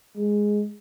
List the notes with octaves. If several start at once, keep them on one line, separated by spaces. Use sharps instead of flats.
G#3